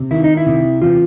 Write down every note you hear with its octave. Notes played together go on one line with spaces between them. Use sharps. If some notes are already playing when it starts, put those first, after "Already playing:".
Already playing: C3
D#3 E4
D#4
E4
C3
E3 F4